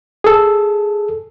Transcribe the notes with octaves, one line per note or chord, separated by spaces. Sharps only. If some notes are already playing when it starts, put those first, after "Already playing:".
G#4 A4